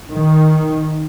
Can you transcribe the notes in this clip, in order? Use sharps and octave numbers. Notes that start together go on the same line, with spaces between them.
D#3